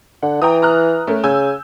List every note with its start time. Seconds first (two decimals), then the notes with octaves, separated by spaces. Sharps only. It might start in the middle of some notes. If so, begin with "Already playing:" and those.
0.23 D3 F#5
0.42 E3 G5 A#5 D#6
0.62 A#5 F6 F#6
1.07 A3 C#4 A#4
1.24 C#3 G#5 E6 G6